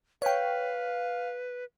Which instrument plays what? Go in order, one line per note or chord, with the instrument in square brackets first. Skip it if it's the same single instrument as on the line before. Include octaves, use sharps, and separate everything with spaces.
[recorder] B4 [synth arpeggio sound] C#5 G5 [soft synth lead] F5